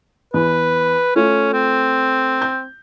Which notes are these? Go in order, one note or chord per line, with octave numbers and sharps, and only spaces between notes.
E2 B4
A3 C#4 F4
C4
G6